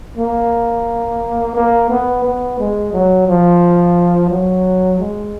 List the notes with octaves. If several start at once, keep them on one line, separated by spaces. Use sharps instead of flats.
A#3
A#3
B3
B3
G#3
F#3
F3
F#3
G#3